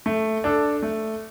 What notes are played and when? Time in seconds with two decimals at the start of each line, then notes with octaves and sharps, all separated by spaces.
0.06 A3
0.44 D4 A4
0.83 A3